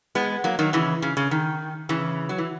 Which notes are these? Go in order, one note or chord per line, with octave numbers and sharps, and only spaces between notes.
G#3 B3
F#3 A#3
D#3 F#3
C#3 E3
C#3
C#3
D#3
C#3 E3
F#3
E3